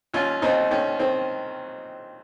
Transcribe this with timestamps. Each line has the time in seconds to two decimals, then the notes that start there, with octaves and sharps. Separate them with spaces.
0.14 D#2 C#4 F4
0.42 D#2 C4 D#4
0.71 D#3 C#4
0.99 D#3 C4